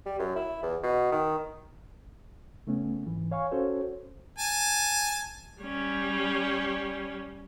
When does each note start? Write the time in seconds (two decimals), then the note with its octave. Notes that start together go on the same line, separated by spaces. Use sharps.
0.06 G3
0.19 F#2
0.36 E4
0.62 E2
0.83 B2
1.11 D#3
2.67 C#3 A3 B3 C#4
3.06 G#2 E3
3.31 C#5 F5 G#5 C#6
3.51 C#4 F#4 A4 C5 C#5
4.39 G#5 A5
5.61 G3 C#4